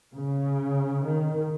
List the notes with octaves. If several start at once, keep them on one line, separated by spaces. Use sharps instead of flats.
C#3
D#3